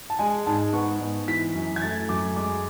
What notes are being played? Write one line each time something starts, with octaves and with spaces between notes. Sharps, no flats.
A5
G#3 G#5
G#2 A5
B3 C#6
G#2
E3 B6
F#2
G#6
A3 A6
F#2 D6
G#3 D6